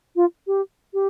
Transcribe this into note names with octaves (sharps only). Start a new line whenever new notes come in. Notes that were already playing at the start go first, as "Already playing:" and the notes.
F4
G4
G4